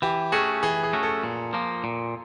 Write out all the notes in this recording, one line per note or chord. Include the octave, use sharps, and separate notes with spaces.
E3 G4
A3 C#4 F#4 G#4
E3 G#4
G#4
A3 C#4 F#4
A4
A#2
F3 A#3
A#2